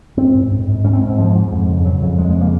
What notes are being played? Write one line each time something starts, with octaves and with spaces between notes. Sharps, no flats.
G#2 C4
G#2
G#2
G#2
G#2 C#4
C4
G#2
C4
G#2 F3
G#2
F2
C#3
C#3 F#3
F2
F2 G#3
G#3
C#3
A#3